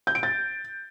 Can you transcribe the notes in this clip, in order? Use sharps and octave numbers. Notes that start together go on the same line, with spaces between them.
G6
D7
A6